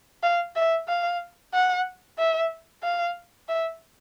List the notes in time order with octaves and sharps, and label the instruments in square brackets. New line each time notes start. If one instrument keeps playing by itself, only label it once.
[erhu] F5
E5
F5
F#5
E5
F5
E5